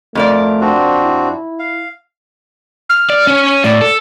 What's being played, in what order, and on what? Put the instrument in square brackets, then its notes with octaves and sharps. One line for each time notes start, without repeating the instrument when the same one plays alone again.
[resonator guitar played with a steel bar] F2 A#4 D5 [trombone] A3
[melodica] C4 D4 F#4
[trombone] E4
[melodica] F5
[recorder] F6
[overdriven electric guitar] D5
C#4 C#5
[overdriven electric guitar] A2 [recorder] D5
[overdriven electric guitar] A4